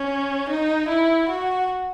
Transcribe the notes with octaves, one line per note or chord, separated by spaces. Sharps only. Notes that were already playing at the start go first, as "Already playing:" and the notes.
Already playing: C#4
D#4
E4
F#4